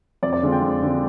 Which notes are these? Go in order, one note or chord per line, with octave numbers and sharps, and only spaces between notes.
F2 D5
D5
D3 G#3 C4 F4
G5
F2
D3 G#3 C4 F4